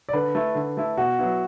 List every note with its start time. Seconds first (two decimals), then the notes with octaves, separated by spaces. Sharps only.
0.09 D5
0.13 D3 B4
0.35 A3 E4
0.55 D3
0.77 A3 E4
0.98 B2 F#4
1.19 F#3 B3 E4